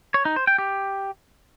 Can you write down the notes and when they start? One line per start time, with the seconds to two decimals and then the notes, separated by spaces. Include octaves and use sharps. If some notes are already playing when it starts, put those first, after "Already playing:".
0.14 C#5
0.25 D#4
0.36 C5
0.47 G5
0.58 G4